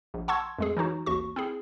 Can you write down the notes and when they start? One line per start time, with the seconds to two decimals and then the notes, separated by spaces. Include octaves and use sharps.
0.14 A#1
0.28 F#5 A5 C6 C#6 E6 G#6
0.59 F2 G#3 G#4
0.77 E3 F#3 D#4 F#4
1.06 A1 D#2 F#4 C#6
1.36 C4 E4 G#4